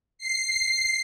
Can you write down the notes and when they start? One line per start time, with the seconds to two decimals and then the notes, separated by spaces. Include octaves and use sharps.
0.18 C7